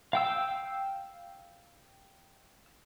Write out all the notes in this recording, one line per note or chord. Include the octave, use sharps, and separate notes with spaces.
F5 G5 E6